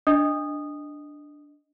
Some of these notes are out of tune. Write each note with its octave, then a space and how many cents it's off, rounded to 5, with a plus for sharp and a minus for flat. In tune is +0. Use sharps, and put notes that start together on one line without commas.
D4 +0 D#5 +0 D#6 -15